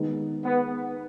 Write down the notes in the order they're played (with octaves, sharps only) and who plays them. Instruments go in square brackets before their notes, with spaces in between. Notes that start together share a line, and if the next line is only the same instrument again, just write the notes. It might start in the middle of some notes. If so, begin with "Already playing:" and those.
Already playing: [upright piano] D#3 G#3 B3 D#4
[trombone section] B3